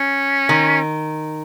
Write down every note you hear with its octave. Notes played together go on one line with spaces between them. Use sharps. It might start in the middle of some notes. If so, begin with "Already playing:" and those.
Already playing: C#4
D#3